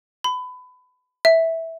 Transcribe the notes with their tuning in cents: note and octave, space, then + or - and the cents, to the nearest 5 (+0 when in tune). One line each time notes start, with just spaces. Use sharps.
B5 +25
E5 -10